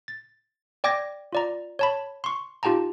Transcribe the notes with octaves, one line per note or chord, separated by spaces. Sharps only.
A6
D5 G5 D6 G#6 A#6
F4 D5 A#5
C#5 A5 B5
C6 C#6
D#4 F4 G4 G5 A5 A#5